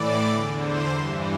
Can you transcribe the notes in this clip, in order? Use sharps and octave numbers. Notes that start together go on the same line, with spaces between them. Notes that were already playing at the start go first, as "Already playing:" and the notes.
Already playing: A2 E3 D5
E2 D3
C5
G2 E3